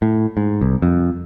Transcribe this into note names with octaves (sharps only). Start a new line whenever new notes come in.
A2
G#2
C2
F2